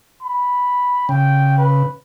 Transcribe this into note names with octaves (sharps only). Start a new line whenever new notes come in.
B5
C#3 G5
B4